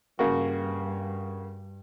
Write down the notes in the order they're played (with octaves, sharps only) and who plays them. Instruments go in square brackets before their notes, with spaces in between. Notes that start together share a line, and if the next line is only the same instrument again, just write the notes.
[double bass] G2 [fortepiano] C#3 A#3 F#4